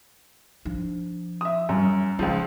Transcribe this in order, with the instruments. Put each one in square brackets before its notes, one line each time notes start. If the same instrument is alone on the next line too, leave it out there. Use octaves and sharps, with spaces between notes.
[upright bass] F3 D4
[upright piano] E5 D#6
[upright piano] F#2 [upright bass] G3
[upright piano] C#2 C#3 F3 [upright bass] F4